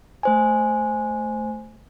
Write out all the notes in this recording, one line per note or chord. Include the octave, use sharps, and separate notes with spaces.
A3 C5 G#5